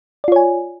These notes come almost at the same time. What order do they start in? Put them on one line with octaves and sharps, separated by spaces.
D5 F4 C#5 G#5